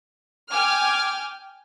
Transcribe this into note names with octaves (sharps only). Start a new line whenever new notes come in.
G5 G#5 D6 F6